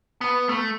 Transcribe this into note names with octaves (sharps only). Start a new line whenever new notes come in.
B3
A3